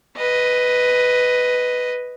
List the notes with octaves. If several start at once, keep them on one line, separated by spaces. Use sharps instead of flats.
B4 D#5